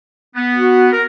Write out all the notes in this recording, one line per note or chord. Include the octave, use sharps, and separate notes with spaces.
B3
F#4
A#4